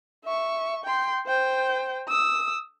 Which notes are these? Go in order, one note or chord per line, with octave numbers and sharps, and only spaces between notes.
E5 C#6
G5 C6
C5 G5
D#6 E6